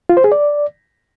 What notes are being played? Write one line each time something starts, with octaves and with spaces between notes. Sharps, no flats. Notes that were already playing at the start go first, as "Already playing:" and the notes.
F4
C5
G#4
D5